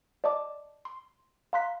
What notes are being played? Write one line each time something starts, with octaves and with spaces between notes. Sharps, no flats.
D5 D#5 A5 D6
C6
F5 A#5 C6 F#6 B6